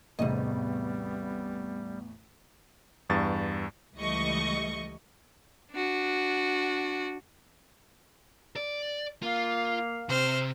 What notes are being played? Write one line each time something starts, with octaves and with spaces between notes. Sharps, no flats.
A1 E2 A2 C3 G3 B3 D#5
E2 G2 A6
C#2 E3 G3 A3 D#5 C#6
D4 F#4
D5
A#3 F4 F5
C3 C5 F6